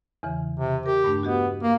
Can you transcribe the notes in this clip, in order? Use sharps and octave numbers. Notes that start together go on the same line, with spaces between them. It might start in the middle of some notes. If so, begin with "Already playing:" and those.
E2 C#3 E3
C3
G4 A#4
G2 A3 D4
B3 F#4 G4 D#5
A#3